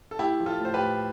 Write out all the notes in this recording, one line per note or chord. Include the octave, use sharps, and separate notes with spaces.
A4
A3 E4 G4
F3
F4 A4
A2 C5
G4 B4
A2